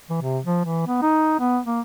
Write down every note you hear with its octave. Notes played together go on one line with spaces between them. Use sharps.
E3
C3
F3
E3
B3
D#4
B3
A#3